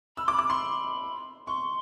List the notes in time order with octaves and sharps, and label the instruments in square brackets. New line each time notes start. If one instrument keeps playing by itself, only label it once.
[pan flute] B5 [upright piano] E6
[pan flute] C6
[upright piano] D6
[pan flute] B5
[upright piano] D6
[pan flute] B5 [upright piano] C6
[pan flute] C6 [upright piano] C#6